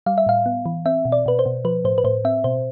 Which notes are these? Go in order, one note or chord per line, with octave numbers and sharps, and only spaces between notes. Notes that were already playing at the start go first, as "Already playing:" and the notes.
G3 F5
E5
A2 F5
B3
E3
C4 E5
B2
D5
B2 B4
C5
B2
F3 B4
A2 C5
B4
A2 C5
C4 E5
B2 C5